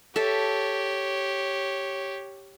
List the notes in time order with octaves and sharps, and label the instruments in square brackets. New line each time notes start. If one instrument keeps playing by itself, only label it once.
[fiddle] G4 C#5 [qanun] A4 E5